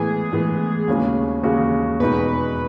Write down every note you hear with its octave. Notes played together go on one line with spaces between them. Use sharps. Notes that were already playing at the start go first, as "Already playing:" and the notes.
Already playing: A2 E3 G#3 B3 G#4
A2 E3 G#3 B3
D#2 C#3 G#3 C#4 F#4
D#2 C#3 G#3 C#4 F#4
E2 B2 G#3 D#4 F#4 B4